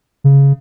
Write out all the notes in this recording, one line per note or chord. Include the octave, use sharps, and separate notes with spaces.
C#3